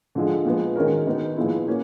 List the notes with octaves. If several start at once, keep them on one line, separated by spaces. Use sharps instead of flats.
D3 F3 G#3
A#2 F3 G#3 B3
D#3 G#3 C#4 F#4 A#4
D#3 G#3 B3 D#4
A#2 F3 G#3 B3 E4
A#3 C#4 F#4